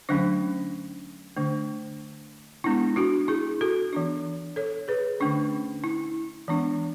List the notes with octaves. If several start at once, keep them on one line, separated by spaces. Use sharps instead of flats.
D3 F#3 A3 C#4 D4
D3 A3 D4
G#3 B3 D4 E4
D4 F#4
E4 G#4
F#4 A4
E3 B3 D4
A4 C#5
G#4 B4
D3 A3 C#4 D4
E4
E3 G#3 B3 D4